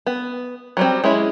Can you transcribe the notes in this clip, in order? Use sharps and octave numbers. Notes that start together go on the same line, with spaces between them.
B3
F#3 G3 C4
G#3 C#4 E4